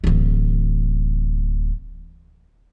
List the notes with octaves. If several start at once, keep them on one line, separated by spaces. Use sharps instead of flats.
D1 E3